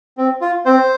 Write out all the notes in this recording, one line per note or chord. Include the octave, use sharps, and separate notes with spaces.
C4
F4
C4 C5